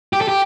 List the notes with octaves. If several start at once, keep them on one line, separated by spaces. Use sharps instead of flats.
G4
A4
G4